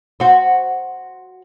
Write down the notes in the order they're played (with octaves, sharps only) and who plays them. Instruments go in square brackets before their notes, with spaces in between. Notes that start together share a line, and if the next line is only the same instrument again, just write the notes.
[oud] F#4 C5